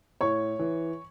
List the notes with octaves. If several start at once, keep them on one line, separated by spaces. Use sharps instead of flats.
A2 C#5 C#6
E3